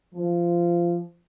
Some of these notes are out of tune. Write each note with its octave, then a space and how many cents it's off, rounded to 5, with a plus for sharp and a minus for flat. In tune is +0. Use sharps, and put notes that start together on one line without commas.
F3 -20